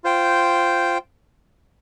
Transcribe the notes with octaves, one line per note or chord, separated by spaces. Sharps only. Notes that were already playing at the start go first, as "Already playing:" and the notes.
F4 C5 G5